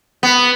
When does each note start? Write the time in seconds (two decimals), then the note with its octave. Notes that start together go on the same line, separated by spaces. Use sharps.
0.23 B3